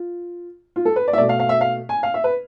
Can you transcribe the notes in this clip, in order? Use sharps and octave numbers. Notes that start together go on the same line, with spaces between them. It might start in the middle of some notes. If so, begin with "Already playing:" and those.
Already playing: F4
F4
A4
B4
D5
E5
B2 A3 D5
F5
F5
E5
F5
G#5
F5
E5
B4